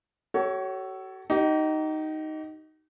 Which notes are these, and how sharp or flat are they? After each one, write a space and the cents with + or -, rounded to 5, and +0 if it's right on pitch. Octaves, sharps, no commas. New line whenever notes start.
F#4 +40 A4 +0 C#5 +0
D#4 +0 G4 -40